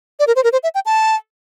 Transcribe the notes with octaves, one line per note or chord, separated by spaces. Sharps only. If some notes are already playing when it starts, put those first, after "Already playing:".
D5
A#4
C5
A#4
C5
E5
G5
A5